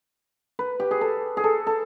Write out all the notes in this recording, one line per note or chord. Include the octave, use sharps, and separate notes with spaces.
B4
G4
G#4
A4
G#4
A4
A4